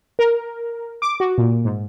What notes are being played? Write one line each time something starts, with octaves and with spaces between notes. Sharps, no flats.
A#4
D6
F#4
A#2
G#2